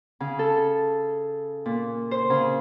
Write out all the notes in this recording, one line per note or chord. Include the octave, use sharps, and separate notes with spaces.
C#3
A4
A#2
C5
C#3